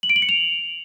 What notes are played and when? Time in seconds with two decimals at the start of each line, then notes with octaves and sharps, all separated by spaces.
0.03 F#7
0.09 D7
0.16 F#7
0.22 C#7
0.29 F7